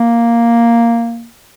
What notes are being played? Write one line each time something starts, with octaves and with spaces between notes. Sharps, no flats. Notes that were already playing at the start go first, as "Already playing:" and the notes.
Already playing: A#3